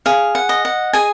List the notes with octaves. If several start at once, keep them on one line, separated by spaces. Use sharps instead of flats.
G#4 F5
F#5
D#5
F#5
G#4 G#5